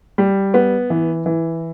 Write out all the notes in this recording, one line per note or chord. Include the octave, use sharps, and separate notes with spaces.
G3
B3
E3
E3